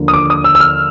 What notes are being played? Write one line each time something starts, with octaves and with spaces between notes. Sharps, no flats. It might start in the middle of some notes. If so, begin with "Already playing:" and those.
Already playing: D#2 D3 F3 A#3 D4
D#6
D6
D#6
E6
E6
F6